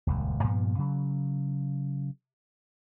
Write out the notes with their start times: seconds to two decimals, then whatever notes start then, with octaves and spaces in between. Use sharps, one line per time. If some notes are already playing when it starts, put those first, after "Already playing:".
0.07 D#1 C#2 F#2
0.44 G2 A#2 F3 B3
0.79 C#3 F#3